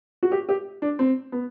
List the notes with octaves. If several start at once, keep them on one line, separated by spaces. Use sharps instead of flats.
F#4
G4
G4
D4
C4
B3